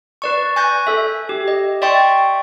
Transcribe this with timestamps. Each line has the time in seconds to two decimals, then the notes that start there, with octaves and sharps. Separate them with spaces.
0.22 B4 D5 C#6
0.56 G#5 C#6 F#6 G6 A#6
0.87 A4 E5
1.29 G4
1.48 D#5
1.82 D5 E5 G5 C6 C#6 A6